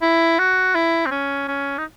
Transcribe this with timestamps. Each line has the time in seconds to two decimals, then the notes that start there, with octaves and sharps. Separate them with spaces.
0.02 E4
0.39 F#4
0.75 E4
1.06 C4
1.11 C#4
1.48 C#4
1.78 D#4